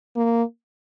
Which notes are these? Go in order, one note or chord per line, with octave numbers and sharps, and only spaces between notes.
A#3